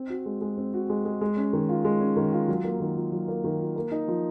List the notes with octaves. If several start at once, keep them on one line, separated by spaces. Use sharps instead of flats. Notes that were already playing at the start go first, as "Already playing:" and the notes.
Already playing: C4
F#4
G#3
G#3
C4
F#4
G#3
G#3
G#3
C#4
D#3
F4
G#3
C#4
D#3
F4
F#3
A#3
D#3
F4
F#3
A#3
D#3
F4
A#3
D#4
F3